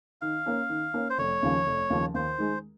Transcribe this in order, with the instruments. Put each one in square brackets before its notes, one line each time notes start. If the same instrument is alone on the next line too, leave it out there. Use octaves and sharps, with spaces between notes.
[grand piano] D#3 [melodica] F5
[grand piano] A#3 C#4
D#3
A#3 C#4
[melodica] C5
[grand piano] F1 [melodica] C#5
[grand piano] D#2 C#3 F3
F1
D#2 C#3 F3
[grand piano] D#2 [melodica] C5
[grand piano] D#3 G#3